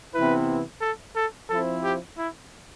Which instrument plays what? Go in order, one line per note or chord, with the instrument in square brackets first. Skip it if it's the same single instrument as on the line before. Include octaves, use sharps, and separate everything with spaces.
[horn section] C3 E3 B3 E4 [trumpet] B4
[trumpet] A4
A4
[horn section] F3 C4 E4 [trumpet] A4
[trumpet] G4
E4